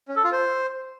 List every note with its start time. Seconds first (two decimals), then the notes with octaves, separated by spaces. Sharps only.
0.08 C#4
0.16 A4
0.24 F4
0.32 C5